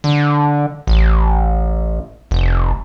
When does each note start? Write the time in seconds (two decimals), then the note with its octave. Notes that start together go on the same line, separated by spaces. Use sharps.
0.04 D3
0.87 A1
2.31 F1